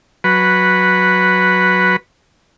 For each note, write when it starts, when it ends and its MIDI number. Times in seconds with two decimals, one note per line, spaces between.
0.24 1.96 54
0.24 1.96 71